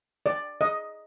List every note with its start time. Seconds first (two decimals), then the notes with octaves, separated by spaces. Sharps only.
0.26 D5
0.61 D#5